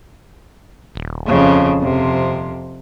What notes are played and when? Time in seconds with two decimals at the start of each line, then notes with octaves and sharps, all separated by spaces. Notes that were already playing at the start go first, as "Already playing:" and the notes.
0.95 D#1
1.26 F2 C#3
1.79 F2 C3